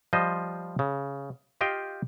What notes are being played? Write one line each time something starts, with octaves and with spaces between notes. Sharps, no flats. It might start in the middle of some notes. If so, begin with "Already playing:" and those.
F3 G3 C5 D#5
C#3
F4 G4 D#5 F5 G5